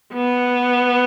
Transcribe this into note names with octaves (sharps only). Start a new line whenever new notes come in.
B3